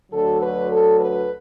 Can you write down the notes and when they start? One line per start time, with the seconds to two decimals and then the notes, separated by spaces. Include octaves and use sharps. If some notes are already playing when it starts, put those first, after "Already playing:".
0.11 D2 D3 F#3 A4
0.41 B4
0.70 A4
1.00 B4